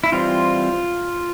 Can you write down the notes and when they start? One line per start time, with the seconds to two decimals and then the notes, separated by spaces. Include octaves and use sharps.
0.04 E4
0.12 E3 G3 C4 F4